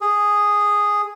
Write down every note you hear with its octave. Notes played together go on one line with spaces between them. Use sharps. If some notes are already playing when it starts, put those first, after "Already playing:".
G#4